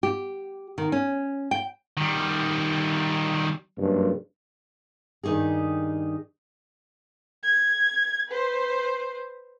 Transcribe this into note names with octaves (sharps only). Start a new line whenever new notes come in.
G4
D#3
C#4
G5
D#3 G3
F#1 G2
G2 D#3 D#4 G4 G#4
G#6
B4 C5